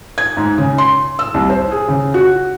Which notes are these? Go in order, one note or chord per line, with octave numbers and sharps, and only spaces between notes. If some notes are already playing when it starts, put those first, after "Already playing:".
G#6
G#2
C#3
C6
E6
C2
C5
G#4
C#3
F#4